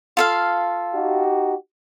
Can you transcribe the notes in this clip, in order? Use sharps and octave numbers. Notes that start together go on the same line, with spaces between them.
F4 A4 F5
D#4 F#4 G4